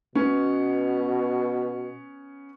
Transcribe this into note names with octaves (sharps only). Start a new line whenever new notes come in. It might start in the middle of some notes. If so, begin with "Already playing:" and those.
B2 B3 C#4